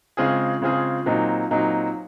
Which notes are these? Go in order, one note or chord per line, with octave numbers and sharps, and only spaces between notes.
C#3 G#3 C4 F4 G#4
C#3 G#3 C4 F4 G#4
A#2 F#3 C4 D#4
A#2 F#3 C4 D#4